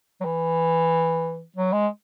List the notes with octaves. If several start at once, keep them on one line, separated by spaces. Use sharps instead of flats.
F#3
E3
F#3
G#3